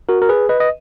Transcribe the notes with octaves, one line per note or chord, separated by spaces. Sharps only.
F#4 A#4
A#4
G#4 B4
B4 D#5
D#5